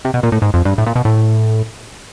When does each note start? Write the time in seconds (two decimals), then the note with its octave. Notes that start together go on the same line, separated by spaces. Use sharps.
0.05 C3
0.14 B2
0.23 A#2
0.32 A2
0.42 G#2
0.54 F2
0.65 G2
0.78 A2
0.86 A#2
0.96 B2
1.05 A2